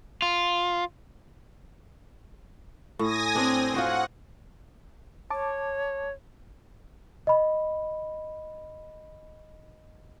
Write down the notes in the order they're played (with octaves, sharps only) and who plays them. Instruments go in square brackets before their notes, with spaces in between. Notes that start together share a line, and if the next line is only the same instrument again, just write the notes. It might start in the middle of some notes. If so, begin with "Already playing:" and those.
[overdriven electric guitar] F4
[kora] A2 [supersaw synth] G#5 D#6 A#6
[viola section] C4 [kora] D4
[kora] F4 F#4 C5 [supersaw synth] F#5
[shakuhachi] C#5 [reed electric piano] A5 D6
[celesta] D#5 B5